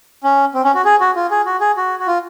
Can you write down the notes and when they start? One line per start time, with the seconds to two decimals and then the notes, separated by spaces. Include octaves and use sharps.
0.24 C#4
0.54 C4
0.64 C#4
0.75 F#4
0.85 G#4
1.00 F#4
1.16 F4
1.31 G#4
1.46 F#4
1.61 G#4
1.77 F#4
1.99 F#4
2.07 F4